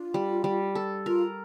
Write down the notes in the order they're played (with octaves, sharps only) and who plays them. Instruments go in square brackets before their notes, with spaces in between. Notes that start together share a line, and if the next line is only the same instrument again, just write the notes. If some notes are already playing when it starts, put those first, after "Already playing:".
Already playing: [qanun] D4 [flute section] F4
[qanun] G3
G3
A4
[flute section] F4 [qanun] A#4